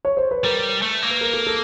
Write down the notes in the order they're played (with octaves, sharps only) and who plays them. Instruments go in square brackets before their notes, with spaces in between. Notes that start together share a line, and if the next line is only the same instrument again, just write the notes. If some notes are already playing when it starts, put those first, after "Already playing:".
[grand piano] C#5
C5
B4
[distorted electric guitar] G3 [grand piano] A#4
[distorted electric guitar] A3
A#3
[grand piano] B4
A#4
A4
A4